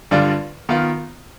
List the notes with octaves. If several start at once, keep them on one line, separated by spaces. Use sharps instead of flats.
G2 D3 G3 D4 F4
D#3 B3 F4